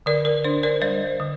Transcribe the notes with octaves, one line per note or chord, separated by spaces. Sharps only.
D3 A#4 D5
A#4
D4 C5
A#4 D5
G3 C5 D#5
D3